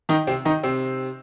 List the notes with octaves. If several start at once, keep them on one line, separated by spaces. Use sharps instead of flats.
D#3 D#4
C3 C4
D#3 D#4
C3 C4